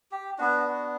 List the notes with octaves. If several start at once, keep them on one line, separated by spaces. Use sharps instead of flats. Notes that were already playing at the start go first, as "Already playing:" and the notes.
G4
B3 D4 F#4
F#4